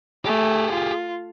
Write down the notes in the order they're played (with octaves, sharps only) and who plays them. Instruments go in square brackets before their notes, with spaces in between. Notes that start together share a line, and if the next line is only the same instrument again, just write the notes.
[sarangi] A3 [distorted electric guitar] G4 G#4
[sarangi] F4